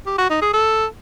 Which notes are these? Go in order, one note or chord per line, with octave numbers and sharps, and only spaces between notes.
G4
F#4
D#4
G#4
A4